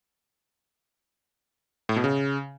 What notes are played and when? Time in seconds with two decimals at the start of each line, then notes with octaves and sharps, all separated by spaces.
1.89 A2
1.96 B2
2.04 C#3